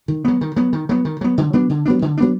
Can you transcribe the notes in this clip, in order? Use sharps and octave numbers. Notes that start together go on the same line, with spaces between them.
D#3
F#3 B3
D#3
F#3 B3
D#3
F#3 B3
D#3
F#3 B3
D3
F#3 B3 D4
D3
F#3 B3 D4
D3
F#3 B3 D4